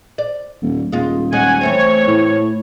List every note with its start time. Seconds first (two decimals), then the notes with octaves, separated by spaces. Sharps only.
0.18 D5
0.62 D#1
0.92 D#1 G#3 F4
1.33 G#3 C#4 F#5 G#5
1.61 E3 A3 C4 C#5
2.08 A2